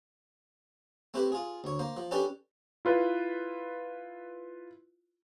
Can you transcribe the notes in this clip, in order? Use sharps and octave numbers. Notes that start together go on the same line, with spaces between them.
A3 C4 E4 G4 B4
F4 G#4
D2 C#5
A#3 C5
F3
C#4 D4 G4 A4 B4 D5
E4 F4 B4